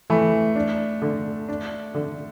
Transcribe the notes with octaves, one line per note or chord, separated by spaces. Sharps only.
E3 A3
D4
D3
D4
D3